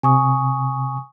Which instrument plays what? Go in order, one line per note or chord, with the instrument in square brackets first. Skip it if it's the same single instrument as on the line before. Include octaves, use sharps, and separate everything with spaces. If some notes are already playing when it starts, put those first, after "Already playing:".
[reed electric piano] C3 [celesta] G#5 C#6 D#6